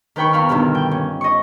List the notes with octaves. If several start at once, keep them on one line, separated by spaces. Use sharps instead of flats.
D#3 B4 G5 B5 C#6
E2 F4 F5 B5 C#6 F6
G2 B2 D3 D#3
G5
C#4
D#5 C#6